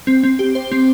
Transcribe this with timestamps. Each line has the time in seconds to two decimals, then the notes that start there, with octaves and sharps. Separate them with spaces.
0.07 C4
0.24 C4
0.39 G4
0.55 C5
0.72 C4